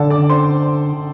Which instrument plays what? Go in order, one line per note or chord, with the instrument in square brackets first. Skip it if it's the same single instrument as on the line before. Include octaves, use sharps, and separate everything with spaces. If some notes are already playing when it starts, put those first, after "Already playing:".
Already playing: [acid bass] D3 [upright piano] A4 A5
[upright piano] D5 D6
C5 C6